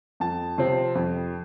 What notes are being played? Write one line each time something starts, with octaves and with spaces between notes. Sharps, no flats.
F2 A5
C3 F3 C4
F2